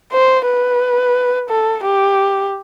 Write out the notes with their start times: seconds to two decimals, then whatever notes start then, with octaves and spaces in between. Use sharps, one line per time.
0.13 C5
0.46 B4
1.50 A4
1.84 G4